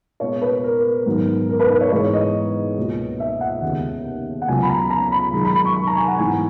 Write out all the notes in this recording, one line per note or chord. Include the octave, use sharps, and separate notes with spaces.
A#2 G#3 B3 C#5
B4
A#4
G#2 D#3 F#3 B3
A#4
B4
B4
C#5
G#2 E3 G#3 B3 C#5
D#5
C#2 B2 A#3
E5
F#5
D#2 C#3 G#3 B3
F#5
C#2 C#3 F#3 B3 G#5
B5
A#5
A#5
B5
F#2 D#3 G#3
B5
B5
C#6
C#6
A#5
G#5
F#5
G#2 E3 B3 G#5